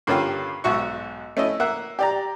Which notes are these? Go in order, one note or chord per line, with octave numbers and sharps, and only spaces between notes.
G2 D3 A#3 C#4 F4 G4
B1 G#2 F#4 E5 C#6
A3 C#4 E4 D#5
A#3 E5 F#5
G4 D5 A#5